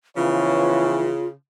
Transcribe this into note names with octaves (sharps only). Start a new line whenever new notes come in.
C#3 E3 F3 B3 F4 C#5